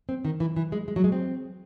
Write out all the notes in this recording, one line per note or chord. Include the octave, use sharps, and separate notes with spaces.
C4
D#3
E3
E3
G#3
G#3
F#3
G#3
C4